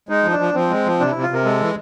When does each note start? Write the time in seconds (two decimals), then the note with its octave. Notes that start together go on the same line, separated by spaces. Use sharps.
0.09 G#3 D#4
0.24 F3
0.31 D4
0.39 F3
0.54 F3 C4
0.69 G#3
0.85 F3
1.00 C3 D4
1.11 C3 E4
1.22 F4
1.30 C3 A#4
1.44 G#3 A4
1.61 E3